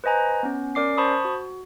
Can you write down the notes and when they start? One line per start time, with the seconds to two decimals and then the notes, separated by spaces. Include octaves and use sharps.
0.04 B4 C5 D#5 G#5 A#5
0.43 B3 C#4
0.75 C#4 A#4 D5 D6 C7
0.97 C5 A5 B5 C#6 D#6
1.25 F#4